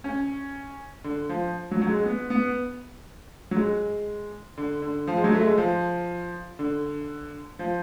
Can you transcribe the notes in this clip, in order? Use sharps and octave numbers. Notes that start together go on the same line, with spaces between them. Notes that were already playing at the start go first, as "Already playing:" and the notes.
C#4
D3
F3
F#3
F#3
G#3
B3
B3
F#3
G#3
D3
D3
F3
G#3
F#3
A3
G#3
F3
D3
F3